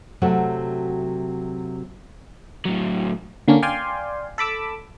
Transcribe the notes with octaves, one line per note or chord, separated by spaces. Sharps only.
C3 F#3 A3 F#4
A2 F#3
D3 A#3 C#4 D4
D5 F5 G5 G#5 C6
A4 B5 D6 E6